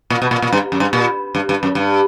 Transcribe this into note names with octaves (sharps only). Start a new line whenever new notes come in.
A#2
B2
A#2
A#2
G2
F#2
G2
A#2
G2
G2
F#2
G2